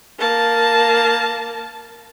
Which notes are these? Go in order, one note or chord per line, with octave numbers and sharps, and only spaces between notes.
A#3 A5